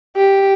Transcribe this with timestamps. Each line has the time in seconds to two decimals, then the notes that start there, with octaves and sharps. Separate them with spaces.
0.16 G4